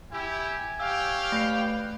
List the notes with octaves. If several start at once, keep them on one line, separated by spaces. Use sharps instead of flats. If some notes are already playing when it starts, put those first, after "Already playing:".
E4 G4 G#5
G4 C#5 F5 G5 E6
A3 B4 G6 C7